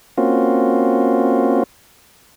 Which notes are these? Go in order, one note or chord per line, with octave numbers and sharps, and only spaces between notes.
A#3 C4 C#4 F4 F#4